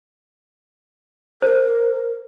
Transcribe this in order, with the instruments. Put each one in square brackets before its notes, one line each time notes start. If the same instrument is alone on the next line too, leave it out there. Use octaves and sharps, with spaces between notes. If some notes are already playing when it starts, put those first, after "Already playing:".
[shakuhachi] A#4 [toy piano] C5